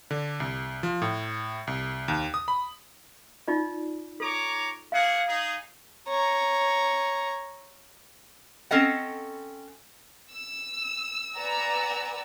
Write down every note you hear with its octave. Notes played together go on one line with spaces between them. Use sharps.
D3
C2
F3
A2
C2
D#2
D#6
B5
D#4 F4 D5
A4 C#5 A#5 D6
A#3 G#4 F5 F#5
D#4 G#4
C#5 A#5
C4 C#4 A4 D#5 F#5
E6
B4 D5 F#5 G#5 A#5 E6